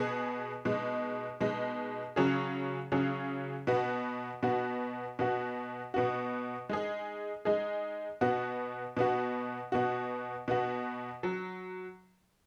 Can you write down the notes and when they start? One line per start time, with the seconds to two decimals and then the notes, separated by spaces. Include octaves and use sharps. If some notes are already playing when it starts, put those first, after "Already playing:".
Already playing: B2 B3 G#4
0.65 B2 G#3 D#4
1.41 B2 G#3 D#4
2.16 C#3 F#3 C#4 G#4
2.92 C#3 F#3 C#4 G#4
3.67 B2 B3 F#4
4.43 B2 B3 F#4
5.19 B2 B3 F#4
5.94 B2 B3 F#4
6.70 G#3 D#4 G#4
7.45 G#3 D#4 G#4
8.21 B2 B3 F#4
8.97 B2 B3 F#4
9.72 B2 B3 F#4
10.48 B2 B3 F#4
11.23 F#3